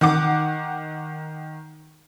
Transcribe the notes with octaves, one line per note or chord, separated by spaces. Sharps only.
D#3 F#5 D6